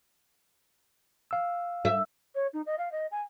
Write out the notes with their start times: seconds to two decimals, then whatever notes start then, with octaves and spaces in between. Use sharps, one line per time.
1.31 F5 E6
1.85 E5
2.35 C#5
2.53 D#4
2.66 D#5
2.78 F5
2.92 D#5
3.11 G#5